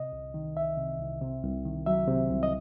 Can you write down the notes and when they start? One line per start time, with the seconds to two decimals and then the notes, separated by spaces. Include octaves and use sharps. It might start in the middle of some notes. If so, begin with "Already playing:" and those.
Already playing: C3 D#5
0.13 C2
0.34 D#3
0.57 C2 E5
0.78 C3
1.00 C2
1.22 C3
1.44 C2
1.65 D#3
1.86 F#3 E5
2.08 C3
2.30 C2
2.43 D#5